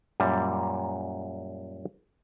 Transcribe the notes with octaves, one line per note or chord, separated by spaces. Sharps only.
F#2 A#2 G3